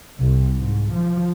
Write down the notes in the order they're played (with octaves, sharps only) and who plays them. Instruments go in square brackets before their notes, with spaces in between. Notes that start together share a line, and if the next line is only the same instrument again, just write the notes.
[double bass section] C2
G#2
F3